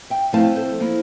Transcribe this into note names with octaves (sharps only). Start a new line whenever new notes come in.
E5 G5
F3 A3 C4 E4 F5 A5
A4 C5
F3 A#3 E4